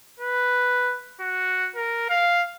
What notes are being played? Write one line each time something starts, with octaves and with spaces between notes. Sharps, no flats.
B4
F#4
A#4
F5